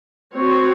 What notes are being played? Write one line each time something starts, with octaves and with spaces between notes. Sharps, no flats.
C4 F#4 C#5